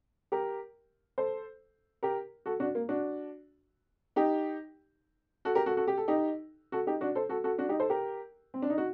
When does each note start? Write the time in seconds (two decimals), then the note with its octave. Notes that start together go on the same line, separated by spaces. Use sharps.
0.32 G4 A#4
1.18 A4 C5
2.03 G4 A#4
2.46 F#4 A4
2.60 D4 F#4
2.75 A#3
2.89 D4 F#4
4.16 D#4 G4
5.45 F#4 A4
5.55 G4 A#4
5.66 F#4 A4
5.77 F#4 A4
5.88 G4
5.97 A4
6.08 D#4 G4
6.72 F#4 A4
6.87 D#4 G4
7.01 D4 F#4
7.15 A4 C5
7.29 F#4 A4
7.44 F#4 A4
7.58 D4 F#4
7.69 D#4 G4
7.79 A4 C5
7.90 G4 A#4
8.54 C4
8.62 D4
8.70 D#4
8.78 F#4